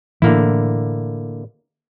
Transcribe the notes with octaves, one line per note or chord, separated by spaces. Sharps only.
A2 D3 E3 A#3 E4